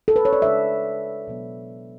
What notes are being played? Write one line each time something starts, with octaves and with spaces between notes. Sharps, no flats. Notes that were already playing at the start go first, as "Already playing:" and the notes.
A4
B4
C#5
D5
C#3 G#3 D4 E5
B2 F#3 B3